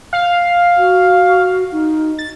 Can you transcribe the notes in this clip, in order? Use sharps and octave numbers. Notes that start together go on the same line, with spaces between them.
F5
F#4
D#4
A6